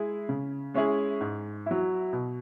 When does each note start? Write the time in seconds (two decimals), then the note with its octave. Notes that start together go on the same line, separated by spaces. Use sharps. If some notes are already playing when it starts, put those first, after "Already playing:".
Already playing: G#3 E4 G#4
0.29 C#3
0.74 G#3 C#4 E4 G#4
1.21 G#2
1.66 F#3 E4
2.13 B2